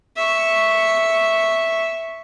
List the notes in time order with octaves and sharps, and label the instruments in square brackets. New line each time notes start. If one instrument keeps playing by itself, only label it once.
[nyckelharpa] E5 C#6